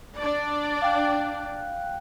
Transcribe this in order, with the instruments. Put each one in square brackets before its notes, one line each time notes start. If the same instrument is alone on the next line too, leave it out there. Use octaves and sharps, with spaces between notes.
[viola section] D4 D5
[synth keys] F5 G5 F#6